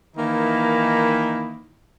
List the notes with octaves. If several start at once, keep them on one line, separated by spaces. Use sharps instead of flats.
D#3 E3 A#3 D#4 E4